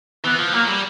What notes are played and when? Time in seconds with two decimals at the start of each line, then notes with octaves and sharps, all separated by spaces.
0.25 E3 B3
0.39 F3
0.53 F#3 A#3
0.68 G3